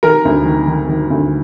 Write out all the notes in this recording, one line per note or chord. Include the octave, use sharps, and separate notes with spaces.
D#3 A#4
D2
D#3
D#3
D#3
D2